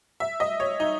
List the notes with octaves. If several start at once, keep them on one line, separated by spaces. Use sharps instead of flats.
E5
D#5
C#5
D#4